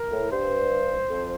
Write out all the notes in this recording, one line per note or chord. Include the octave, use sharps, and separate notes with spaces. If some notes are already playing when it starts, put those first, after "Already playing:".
Already playing: A#4
A2
G2 C5
F2